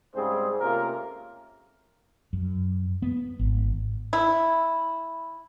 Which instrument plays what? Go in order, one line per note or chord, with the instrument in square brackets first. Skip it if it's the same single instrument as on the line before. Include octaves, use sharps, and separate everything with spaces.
[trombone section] G#2 C#3 G3 C4 G#4 C5
C3 A3 A#3 C#4 F4 A#4
[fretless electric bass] F#2
B3
G#1
[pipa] E4